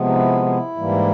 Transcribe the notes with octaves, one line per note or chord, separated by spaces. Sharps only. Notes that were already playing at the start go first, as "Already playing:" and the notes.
Already playing: C3 F3 G#3 B3
D#4
E4
E4
G#2 E3 G3 A#3